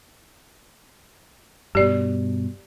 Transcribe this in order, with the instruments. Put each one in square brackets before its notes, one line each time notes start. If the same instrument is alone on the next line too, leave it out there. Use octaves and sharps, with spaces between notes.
[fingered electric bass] G2 B2 [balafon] G4 D5